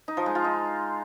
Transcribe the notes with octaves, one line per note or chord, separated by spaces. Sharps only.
D#4
F3
G#3
F4
D#4